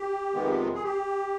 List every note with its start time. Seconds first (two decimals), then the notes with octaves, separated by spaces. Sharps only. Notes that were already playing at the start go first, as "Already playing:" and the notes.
Already playing: G4
0.34 F2 C3 D#3 G#3 B3
0.74 G#4
0.84 G4